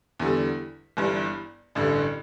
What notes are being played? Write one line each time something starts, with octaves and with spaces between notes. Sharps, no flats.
E2 D3 G3
G1 G2 E3
A1 G2 D3